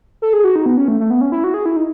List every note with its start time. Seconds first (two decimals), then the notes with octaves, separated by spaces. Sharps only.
0.22 A4
0.33 G#4
0.44 F#4
0.56 D#4
0.66 B3
0.77 C#4
0.88 A3
1.00 A3
1.10 B3
1.21 C#4
1.32 E4
1.44 F#4
1.54 G#4
1.66 E4
1.76 D#4